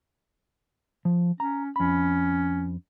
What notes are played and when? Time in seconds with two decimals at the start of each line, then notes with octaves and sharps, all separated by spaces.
1.05 F3
1.40 C#4 A#5
1.76 F2 C#4 B5